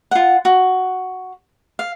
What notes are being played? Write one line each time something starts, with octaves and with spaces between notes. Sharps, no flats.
F4 F#5
F#4
F5